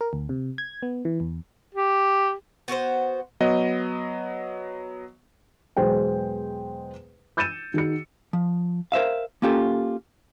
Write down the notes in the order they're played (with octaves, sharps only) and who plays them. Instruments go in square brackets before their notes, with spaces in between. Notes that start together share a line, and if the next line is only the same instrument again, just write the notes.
[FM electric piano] A#4
D2
C3
G#6
B3
E3
E2
[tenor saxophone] G4
[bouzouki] B3 F#4 A4 C5
[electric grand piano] F#3 B3 D#5
[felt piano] E2 B2 F#3 G#3 C5 G5
E6 G6 A6 C#7 D#7 E7
D#3 F#4 G#4 C#7
[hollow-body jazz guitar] F3
A#4 C5 E5 F5
A#3 C#4 F4 G4 A4